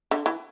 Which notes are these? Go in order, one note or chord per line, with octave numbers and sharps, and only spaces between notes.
D3
E3